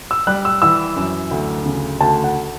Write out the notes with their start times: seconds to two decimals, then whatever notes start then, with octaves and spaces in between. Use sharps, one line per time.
0.11 E6
0.27 G3 F#6
0.45 E6
0.62 E3 E6
0.96 F#2
1.31 D2
1.66 C#3
2.00 D2 A5
2.24 F#5